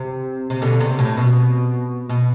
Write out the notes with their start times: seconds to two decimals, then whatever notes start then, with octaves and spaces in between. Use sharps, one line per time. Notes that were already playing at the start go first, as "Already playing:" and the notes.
Already playing: C3
0.50 C3
0.62 B2 D3
0.80 C3
0.99 A2
1.17 B2
2.09 B2